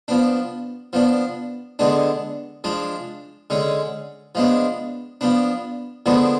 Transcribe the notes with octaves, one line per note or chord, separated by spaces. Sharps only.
F3 B3 D4
F3 B3 D4
D3 G#3 B3 D4
F3 G#3 D4
D3 G#3 C#4
F3 G#3 B3 D4
F3 B3 D4
D3 F3 G#3 B3 D4